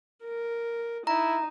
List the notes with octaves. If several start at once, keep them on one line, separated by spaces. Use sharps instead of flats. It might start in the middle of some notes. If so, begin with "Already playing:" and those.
A#4
D#4 E4 A#5